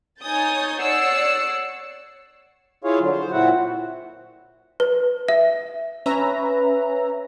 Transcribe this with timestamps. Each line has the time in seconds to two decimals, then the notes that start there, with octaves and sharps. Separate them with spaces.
0.23 D#4 C#5 G#5 D#6 G6 A6
0.80 C#5 D5 F#5 E6 C7 C#7
2.84 E4 F4 G#4 C#5 F5
3.00 D3 F#3
3.12 C5
3.32 A#2 C4 E4 F#4 F#5
4.80 B4
5.28 E5
6.06 C#4 B4 E5 A#5